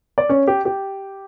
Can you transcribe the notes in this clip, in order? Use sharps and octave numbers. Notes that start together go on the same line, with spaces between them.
D5
C#4 C#5
G4
G4